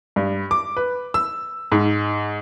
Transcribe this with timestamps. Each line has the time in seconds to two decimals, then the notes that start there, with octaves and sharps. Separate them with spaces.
0.16 G2
0.51 D6
0.77 B4
1.14 E6
1.72 G#2